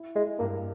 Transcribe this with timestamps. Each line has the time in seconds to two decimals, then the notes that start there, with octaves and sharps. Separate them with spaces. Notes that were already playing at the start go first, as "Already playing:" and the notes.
Already playing: E4
0.15 G#3 E4
0.39 G2 A#3